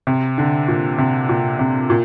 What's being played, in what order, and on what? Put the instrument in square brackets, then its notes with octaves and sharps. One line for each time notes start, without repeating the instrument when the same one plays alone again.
[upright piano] C3
D3
A#2
C3
A#2
C3
A#2